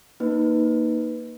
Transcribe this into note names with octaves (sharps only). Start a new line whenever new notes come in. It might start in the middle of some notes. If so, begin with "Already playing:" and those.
A#3 D#4 B4